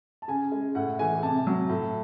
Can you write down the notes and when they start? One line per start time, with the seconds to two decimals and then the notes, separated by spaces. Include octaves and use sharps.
0.22 A5
0.28 C#3 G#5
0.52 G#3
0.75 A2 F#5
0.99 E3 G#3 G#5
1.23 C3 A5
1.47 F#3
1.69 A2